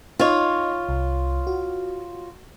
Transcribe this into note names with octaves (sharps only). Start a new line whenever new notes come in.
D#4 F4 C#5 D#5
C2
F#4